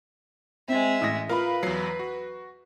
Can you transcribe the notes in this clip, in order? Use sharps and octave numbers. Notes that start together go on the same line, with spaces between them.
G#3 C4 E5
A1 D#6 A#6
F4 A#4 B4 F5 B5
E2 F#3 C7
F#4